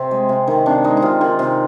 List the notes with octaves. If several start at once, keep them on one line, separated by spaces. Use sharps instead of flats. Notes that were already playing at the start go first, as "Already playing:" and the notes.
Already playing: C3 C4
G#3
C3
D#3
C3 D4
G#3 D#4
D#4
C3 F4
D#3 F4
C3